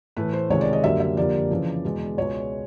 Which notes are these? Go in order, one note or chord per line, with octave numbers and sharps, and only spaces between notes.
A2 E3 A3 B4
C5
C#2 C3 D#3 G#3 C#5
D5
D#5
F#2 D3 G3 A#3 E5
E5
F2 D3 G3 A#3 D5
F2 C#3 E3
E2 B2 G#3
C#2 B2 G#3 C#5